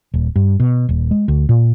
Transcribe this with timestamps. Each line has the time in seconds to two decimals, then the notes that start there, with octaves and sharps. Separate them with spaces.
0.14 D#1
0.36 G2
0.60 B2
0.89 D#1
1.11 G#3
1.28 D2
1.49 A#2